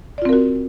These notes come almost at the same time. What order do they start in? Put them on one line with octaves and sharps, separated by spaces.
D5 F4 C4 A#4 F#4